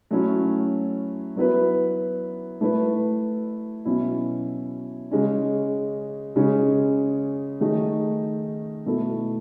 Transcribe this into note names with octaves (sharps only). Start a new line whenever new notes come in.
F#3 A3 C#4 E4
F#3 B3 E4 B4
A3 E4 B4
B2 F#3 C#4 E4
C#3 G#3 C#4
C#3 G#3 C#4
D#3 A3 D#4 G#4
B2 A3 E4 A4